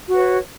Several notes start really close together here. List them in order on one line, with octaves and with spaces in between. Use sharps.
F#4 B4 C#5